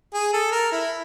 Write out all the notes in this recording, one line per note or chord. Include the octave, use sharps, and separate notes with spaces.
G#4
A4
A#4
E4